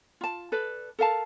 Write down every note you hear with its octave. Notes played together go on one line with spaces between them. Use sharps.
F4 A5
A4 B4 D5
A4 A#4 F5 A5